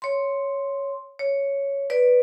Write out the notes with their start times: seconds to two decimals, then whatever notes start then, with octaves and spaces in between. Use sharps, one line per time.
0.02 C#5 C6
1.19 C#5
1.90 B4 D5